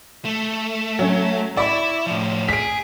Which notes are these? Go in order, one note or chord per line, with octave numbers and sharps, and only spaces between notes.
A3
F#3 C#4
E4 D5 B5 C#6
A2 F3
G#4 B6 D7